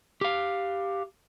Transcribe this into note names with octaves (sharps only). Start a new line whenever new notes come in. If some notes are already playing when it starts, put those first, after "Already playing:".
G4 F5